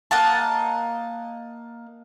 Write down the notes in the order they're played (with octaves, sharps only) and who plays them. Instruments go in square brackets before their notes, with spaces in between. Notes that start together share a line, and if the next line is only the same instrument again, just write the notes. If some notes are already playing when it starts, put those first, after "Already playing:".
[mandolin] A#3 D#5 F#5 A5